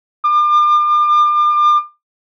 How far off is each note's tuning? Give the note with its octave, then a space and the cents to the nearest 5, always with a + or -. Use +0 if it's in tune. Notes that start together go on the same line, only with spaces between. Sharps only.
D6 +35